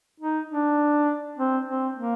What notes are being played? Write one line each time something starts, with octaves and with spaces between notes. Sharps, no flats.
D#4
D4
C4
C4
A#3